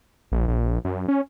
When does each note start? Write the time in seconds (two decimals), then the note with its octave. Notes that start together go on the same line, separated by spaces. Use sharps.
0.32 A#1
0.48 A#1
0.85 F#2
1.08 C#4